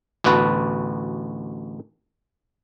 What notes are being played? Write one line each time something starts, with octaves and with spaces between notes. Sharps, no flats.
A1 D2 B3 F#4 B4 A5